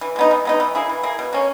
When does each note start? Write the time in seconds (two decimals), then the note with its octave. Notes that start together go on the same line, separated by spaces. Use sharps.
0.01 E3
0.16 G#3 B3 D#4
0.31 E3
0.45 G#3 B3 D#4
0.60 E3
0.75 A#3 E4 G#4
0.89 E3
1.03 A#3 E4 G#4
1.19 B2
1.33 A#3 C#4